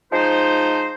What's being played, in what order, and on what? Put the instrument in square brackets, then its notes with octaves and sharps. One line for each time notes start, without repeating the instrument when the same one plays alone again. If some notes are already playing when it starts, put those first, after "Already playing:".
[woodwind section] F3 G#3 D#4 C5